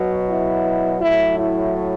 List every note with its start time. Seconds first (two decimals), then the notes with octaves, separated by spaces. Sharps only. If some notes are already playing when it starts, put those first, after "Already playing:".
Already playing: B2 F#3
0.28 E4
1.01 A2 F#3 E4
1.38 E4